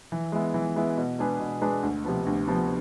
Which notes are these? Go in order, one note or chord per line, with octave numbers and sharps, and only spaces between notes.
E3
G#3 B3 E4
E3
G#3 B3 E4
B2
G#3 D4 G#4 B4
B2
G#3 D4 G#4 B4
D2
C3 F3 B3
D2
C3 F3 B3